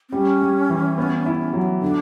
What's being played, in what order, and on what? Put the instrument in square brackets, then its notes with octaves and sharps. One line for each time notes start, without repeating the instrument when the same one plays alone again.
[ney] C4
[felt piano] G3 [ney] C#4
[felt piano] G3
E3
B3
E4
F#3
[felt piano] D3 [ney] D4